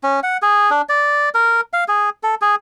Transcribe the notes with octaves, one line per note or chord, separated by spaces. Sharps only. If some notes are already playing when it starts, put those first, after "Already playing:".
C#4
F#5
G#4
D4
D5
A#4
F5
G#4
A4
G#4